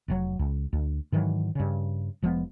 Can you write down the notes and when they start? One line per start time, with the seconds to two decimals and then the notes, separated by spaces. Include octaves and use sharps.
0.08 F1 A#2 F#3
0.39 C#2
0.73 D2
1.12 G#2 D#3 E3 F#3
1.55 G2 C#3
2.22 F1 F3 G#3 B3